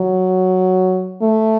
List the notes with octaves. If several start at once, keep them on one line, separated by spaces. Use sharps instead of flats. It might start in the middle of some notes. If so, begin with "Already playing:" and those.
Already playing: F#3
A3